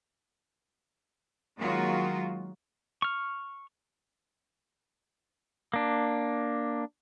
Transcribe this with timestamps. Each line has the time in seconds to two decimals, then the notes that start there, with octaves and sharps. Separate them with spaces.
1.57 D#3 F#3 G#3 A#3 F4 F#4
3.02 C#6 F6
5.74 A#3 D4